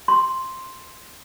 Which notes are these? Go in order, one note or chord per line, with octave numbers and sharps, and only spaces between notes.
C6